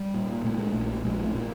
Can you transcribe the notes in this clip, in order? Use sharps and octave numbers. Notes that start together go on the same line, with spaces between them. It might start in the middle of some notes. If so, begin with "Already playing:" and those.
Already playing: G3
A#2
A#2 A3
G#3
A#1 A3
A#1 G#3
A3
A#2